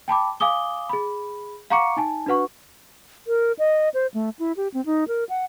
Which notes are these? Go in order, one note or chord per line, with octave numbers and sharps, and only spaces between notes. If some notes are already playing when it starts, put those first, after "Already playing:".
G5 A5 B5 D6
F5 G#5 D6 D#6 G7
G#4 B5
F5 F#5 A#5 C#6 D6 C#7
D#4 G#5 A5
D4 F#4 B4 F#5 C#6
A#4
D#5
C5
A3
E4
G4
C4
D#4
A#4
F#5